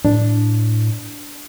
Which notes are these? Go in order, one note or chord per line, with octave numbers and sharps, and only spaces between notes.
A2 D4